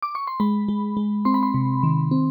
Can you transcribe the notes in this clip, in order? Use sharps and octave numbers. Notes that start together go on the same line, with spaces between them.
D6
C#6
C6
G#3 B5
G#3
G#3
C4 C6
B5
C6
C3
D#3
C4